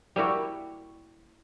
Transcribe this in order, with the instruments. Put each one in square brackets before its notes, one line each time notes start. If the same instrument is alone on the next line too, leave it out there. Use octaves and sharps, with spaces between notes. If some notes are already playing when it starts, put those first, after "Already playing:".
[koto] G3 A#3 E4 F#4